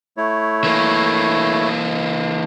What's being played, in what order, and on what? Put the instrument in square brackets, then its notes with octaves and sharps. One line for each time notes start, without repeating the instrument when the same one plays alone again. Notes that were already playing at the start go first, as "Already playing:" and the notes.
[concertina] A3 E4 C#5
[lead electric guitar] E3 A#3